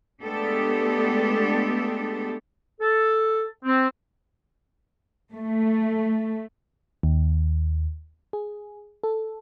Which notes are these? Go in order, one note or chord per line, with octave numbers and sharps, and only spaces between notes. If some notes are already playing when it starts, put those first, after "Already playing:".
G#3 A3 B3 D4 G4 A4
A4
C4
A3
D#2
G#4
A4